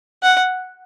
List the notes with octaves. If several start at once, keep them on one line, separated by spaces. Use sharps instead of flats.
F#5